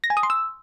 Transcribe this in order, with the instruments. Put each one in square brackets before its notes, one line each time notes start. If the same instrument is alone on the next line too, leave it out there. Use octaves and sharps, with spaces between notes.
[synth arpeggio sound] A#6
G#5
D#6
C6
E6